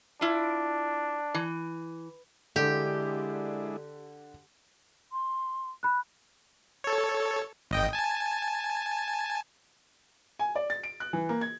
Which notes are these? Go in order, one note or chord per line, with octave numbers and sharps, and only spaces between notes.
D4 E4 F4
E3
D3 G#3 D4 E4 G4
C6
B5 F#6
A4 C#5
G#1 D#5 G5
G#5 A5
G#5
D5
A6
D7
F#6
E3
A#3
G#6